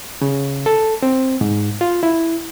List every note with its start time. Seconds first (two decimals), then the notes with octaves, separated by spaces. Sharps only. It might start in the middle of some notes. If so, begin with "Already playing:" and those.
0.22 C#3
0.66 A4
1.03 C4
1.41 G#2
1.81 F4
2.03 E4